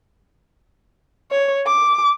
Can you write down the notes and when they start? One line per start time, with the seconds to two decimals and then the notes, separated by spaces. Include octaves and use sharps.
1.31 C#5
1.67 D6